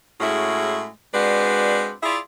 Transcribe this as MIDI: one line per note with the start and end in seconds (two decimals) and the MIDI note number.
0.21 0.88 45
0.21 0.88 56
0.21 0.88 61
0.21 0.88 64
0.21 0.88 66
0.21 0.88 68
1.14 1.94 56
1.14 1.94 60
1.14 1.94 62
1.14 1.94 66
1.14 1.94 71
1.14 1.94 74
2.03 2.19 64
2.03 2.19 65
2.03 2.19 68
2.03 2.19 74
2.03 2.19 76